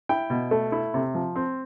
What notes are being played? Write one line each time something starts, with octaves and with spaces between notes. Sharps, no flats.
E4 G5
B2
A3
E4
C3
F3
C4